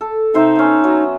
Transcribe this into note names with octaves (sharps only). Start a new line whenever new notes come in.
A4
C3 D#4 C5 E5
B3 C#4
F#3